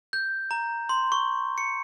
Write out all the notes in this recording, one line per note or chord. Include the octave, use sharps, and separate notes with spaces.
G6
A#5
C6
C#6
C#7